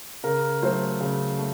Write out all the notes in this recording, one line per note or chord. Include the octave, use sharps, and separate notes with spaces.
C#3 A#4
F#3 A3 C5
C#3
A3